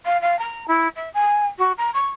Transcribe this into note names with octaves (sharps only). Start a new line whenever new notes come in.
F5
F5
A#5
E4
E5
G#5
F#4
A#5
C#6